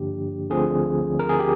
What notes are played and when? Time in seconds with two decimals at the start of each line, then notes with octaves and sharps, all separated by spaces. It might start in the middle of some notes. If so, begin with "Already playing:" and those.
Already playing: G2 D3 F3 A#3 D4 G4
0.50 D2 D3 F3 C4 G#4
1.19 A#4
1.29 G#4
1.39 G4